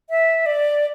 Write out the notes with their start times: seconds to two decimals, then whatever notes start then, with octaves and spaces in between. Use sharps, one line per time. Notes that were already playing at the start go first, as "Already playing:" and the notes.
0.10 E5
0.46 D5